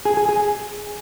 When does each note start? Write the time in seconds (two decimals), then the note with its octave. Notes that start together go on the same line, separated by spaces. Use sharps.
0.05 G#4
0.17 G#4
0.29 G#4